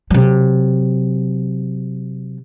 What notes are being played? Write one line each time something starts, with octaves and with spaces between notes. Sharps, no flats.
C3 F#3